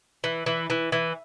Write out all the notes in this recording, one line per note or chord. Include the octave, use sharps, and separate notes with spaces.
E3
E3
E3
E3